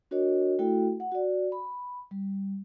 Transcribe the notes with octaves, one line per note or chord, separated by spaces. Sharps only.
D4 F#4 A#4 C#5 D#5
A3 E4 F#4 A4 G5
F#5
F#4 D5
B5
G3